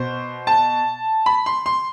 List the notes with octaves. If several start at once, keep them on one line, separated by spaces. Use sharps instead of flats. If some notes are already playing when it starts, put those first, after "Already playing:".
Already playing: B2 C5
A5
B5
C6
C6